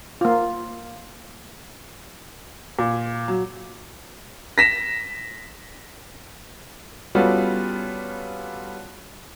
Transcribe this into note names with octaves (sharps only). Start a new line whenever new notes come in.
A#3 F4
A#2
F#3
A#6 B6 E7
G3 B3 C#4 F4 F#4 A4